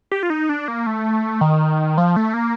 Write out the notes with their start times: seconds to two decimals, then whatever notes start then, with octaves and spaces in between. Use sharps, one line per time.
0.11 G4
0.23 F4
0.30 D#4
0.49 D4
0.68 A#3
0.87 A3
1.41 D#3
1.98 F3
2.16 A3
2.34 A#3